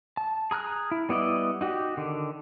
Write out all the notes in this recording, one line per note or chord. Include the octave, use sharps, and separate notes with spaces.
A5
G#4 A#5 F6 F#6
E4
G3 B3 E4 D5 D#5
D#4 F#4 G4
D3 D#3